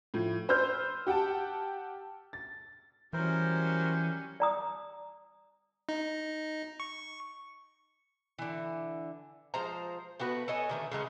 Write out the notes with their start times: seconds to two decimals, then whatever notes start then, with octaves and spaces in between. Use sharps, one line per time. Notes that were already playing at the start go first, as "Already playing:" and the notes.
0.14 A2 F3
0.49 B4 C5 E6 F6 G6
1.07 G4 F#5 G5 A5
2.33 A6
3.13 E3 F#3 G3 C#4 A#4 C5
4.40 D5 A#5 D#6
5.89 D#4
6.80 C#6
8.39 D3 E3
9.54 F3 G#3 C5 A#5
10.20 A3 B3 F#4 B4
10.48 A4 C#5 D#5 G#5
10.69 D3 D#3 A3
10.92 C#3 F#3 G#3 C#4